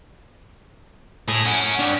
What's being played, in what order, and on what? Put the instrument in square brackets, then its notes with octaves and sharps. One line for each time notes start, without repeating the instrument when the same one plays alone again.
[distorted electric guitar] A2 [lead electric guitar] G#4
[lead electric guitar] C#4 [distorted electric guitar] F#5 G#5
[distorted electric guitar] D4 G5